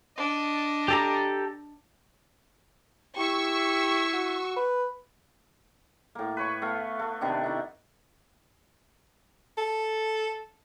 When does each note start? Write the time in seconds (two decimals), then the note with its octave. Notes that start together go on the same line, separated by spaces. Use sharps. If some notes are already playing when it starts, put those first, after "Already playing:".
0.17 D4 D#5
0.88 G4 A4 A#5
3.17 E4 G4 C#6 E6
4.13 F#4
4.57 B4
6.15 A2 A#3
6.37 B4 C#5 C#6
6.62 A3 B3 F5
6.99 A3
7.21 C3 D#3 B3 D4
7.44 D#4 E4
9.58 A4